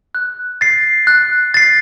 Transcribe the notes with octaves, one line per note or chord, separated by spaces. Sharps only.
F#6
A6 C7
F#6
A6 C7